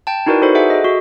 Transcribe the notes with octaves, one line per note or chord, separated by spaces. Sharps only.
G5 A5
D#4 E4 F#4 A#4 B4 D5
D#4 F#4 A4 B4 C5 D5
G#4 E5 F#5 G#5
G#4 A4 D#5
F#4 B6